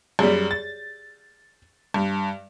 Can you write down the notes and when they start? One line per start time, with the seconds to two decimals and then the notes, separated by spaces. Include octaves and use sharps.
0.19 F#2 G3 G4 G#4 D5
0.51 A6
1.94 G2